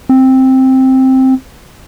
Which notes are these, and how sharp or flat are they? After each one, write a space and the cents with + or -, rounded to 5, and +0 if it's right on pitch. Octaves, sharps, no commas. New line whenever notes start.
C4 +5